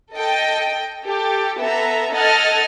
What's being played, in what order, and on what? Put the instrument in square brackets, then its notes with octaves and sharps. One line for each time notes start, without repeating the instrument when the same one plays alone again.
[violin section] A4 D#5 G5
G4 A4
B3 A4 E5 A#5
A4 D#5 F#5 F6 G#6 A6